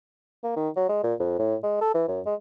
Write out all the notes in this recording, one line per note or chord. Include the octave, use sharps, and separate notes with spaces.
A#3
D#3
F#3
G#3
A#2
F2
A2
G#3
A4
E3
F#2
G#3